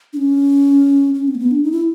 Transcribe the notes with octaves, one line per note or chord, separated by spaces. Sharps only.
D4
C#4
C#4
C4
A#3
B3
D4
D#4
E4